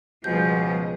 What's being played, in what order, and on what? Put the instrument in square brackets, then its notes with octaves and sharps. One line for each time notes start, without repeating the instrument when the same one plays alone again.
[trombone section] C#2 B2 [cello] F3 G3 [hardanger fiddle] G#4 [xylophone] G6